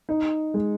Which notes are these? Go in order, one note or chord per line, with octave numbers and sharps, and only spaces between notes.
D#4
G#3